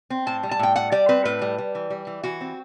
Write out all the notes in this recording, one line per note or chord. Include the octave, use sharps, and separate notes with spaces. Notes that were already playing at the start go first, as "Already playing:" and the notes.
C4
A2 A5
G3
A5
A2 G5
G3 F#5
G3 D5
C4 B4
A2 B4
G3
G3
E3
G3
E3
E3 F#4
C4